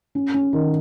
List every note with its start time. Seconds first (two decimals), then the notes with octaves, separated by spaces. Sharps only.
0.15 C#4
0.34 C#4
0.53 D#3